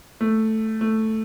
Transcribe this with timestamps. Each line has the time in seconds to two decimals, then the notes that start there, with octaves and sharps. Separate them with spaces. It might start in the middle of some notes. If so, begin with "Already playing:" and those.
0.21 A3
0.81 A3